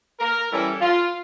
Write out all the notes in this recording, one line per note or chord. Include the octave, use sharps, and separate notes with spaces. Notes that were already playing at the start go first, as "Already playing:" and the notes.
A#4
E3 G3 C#4 E4 A4
F4